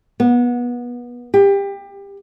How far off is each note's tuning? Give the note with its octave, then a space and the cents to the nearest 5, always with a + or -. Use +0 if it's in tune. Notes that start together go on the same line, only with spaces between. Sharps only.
B3 -25
G4 +25